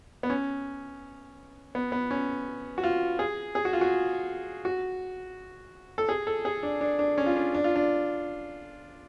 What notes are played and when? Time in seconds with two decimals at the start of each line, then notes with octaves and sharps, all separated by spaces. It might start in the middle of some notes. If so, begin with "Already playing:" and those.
0.23 B3
0.30 C#4
1.75 B3
1.92 B3
2.11 C#4
2.78 F#4
2.83 F4
3.19 G#4
3.55 G#4
3.65 F#4
3.73 F4
3.81 F#4
4.65 F#4
5.98 A4
6.09 G#4
6.27 A4
6.45 G#4
6.63 D4
6.81 D4
6.99 D4
7.18 C#4
7.26 F4
7.36 D4
7.54 D4
7.64 F4
7.76 D4